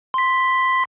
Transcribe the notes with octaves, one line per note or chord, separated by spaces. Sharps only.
C6 B6